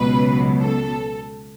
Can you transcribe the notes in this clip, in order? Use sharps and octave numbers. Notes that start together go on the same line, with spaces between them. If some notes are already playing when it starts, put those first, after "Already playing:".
Already playing: C#2 B2 F#3 B4
A4